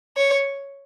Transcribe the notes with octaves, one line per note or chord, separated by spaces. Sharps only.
C#5